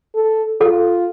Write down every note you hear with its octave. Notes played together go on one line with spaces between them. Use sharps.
A4
F4 A4